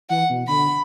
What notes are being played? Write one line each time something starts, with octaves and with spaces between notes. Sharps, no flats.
E3 F#5
B2
D3 B5